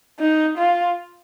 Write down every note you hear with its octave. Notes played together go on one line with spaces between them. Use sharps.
D#4
F4